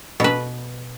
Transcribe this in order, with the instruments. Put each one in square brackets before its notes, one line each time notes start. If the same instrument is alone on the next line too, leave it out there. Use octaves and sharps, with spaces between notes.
[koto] B2 B4